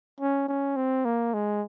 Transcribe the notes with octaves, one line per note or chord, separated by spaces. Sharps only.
C#4
C#4
C4
A#3
G#3